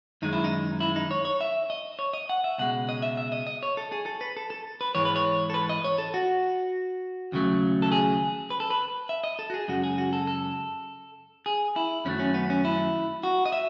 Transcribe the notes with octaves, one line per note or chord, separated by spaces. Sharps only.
F#2 D#3 G#3 D#4
E4
D#4
E4
D#4
C#5
C#5
E5
D#5
C#5
D#5
F#5
E5
C#2 B2 G#3 F#5
D#5
E5
E5
D#5
D#5
C#5
A4
G#4
A4
B4
A4
A4
B4
G#2 E3 G#3 C#5
B4
C#5
A4
B4
D#5
C#5
A4
F#4
D#2 C#3 F#3 A3
A4
G#4
B4
A4
B4
E5
D#5
A4
F#4
G#4
F#2 C#3 G#3 F#4
G#4
F#4
A4
A4
G#4
E4
F#2 D#3 F#3 A3 C#4
C#4
B3
C#4
E4
F#4
D#5
E5